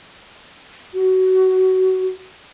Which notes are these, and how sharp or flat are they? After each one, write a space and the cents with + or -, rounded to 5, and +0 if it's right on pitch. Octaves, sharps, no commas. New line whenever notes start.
F#4 +20